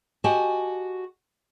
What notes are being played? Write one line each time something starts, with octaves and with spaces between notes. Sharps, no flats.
F#4 G4 D#5 G#5 A5